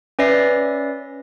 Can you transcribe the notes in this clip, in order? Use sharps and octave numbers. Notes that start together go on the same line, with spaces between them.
C#4 B4 D5 E5 A#6 C7